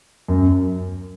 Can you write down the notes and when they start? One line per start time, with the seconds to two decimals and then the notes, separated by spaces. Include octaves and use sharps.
0.28 F#2